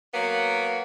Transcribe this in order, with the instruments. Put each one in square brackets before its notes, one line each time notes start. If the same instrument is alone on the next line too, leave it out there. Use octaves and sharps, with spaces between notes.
[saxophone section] F#3 A#3 B3